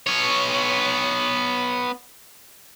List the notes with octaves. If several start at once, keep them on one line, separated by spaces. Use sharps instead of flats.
B3 C#5